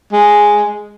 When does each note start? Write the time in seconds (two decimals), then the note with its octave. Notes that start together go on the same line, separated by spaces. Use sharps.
0.12 G#3